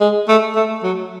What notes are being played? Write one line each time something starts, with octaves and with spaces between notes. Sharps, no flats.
G#3
A3
A3
F#3